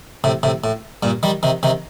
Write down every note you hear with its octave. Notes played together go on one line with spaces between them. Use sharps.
A2 C3
A2 C3
A2
G2 A#2
D#3 G3
C3 D#3
C3 D#3